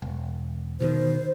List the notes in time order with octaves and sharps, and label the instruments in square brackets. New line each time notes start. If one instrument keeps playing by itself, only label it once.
[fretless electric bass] E1
[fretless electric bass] B2 D3 D#3 [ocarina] C5